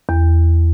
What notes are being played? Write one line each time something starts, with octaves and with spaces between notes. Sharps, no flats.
E2